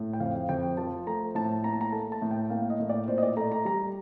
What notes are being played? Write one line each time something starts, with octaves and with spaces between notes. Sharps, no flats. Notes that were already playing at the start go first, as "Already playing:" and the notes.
Already playing: A2
G5
F2 F5
F5
F2 G5
G5
F3 A5
A3 A#5
A2 A5
A#3 A#5
A5
A#5
A3 A5
A5
A2
G5
A#3 F5
D#5
A2
D5
A#2 C5
D#5
D5
A3 A#5
A#5
G3 A#5